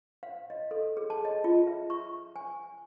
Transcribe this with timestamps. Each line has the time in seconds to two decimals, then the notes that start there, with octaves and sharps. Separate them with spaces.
0.23 F5
0.50 D#5
0.71 A4
0.97 G#4
1.10 A5
1.25 D#5
1.44 F4
1.67 E5
1.90 C#6
2.36 G#5